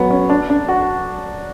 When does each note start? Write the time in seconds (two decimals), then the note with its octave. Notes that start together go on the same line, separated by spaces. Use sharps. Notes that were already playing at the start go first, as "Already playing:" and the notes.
Already playing: F#3 B3
0.11 C#4
0.30 D4
0.50 D4
0.68 F#4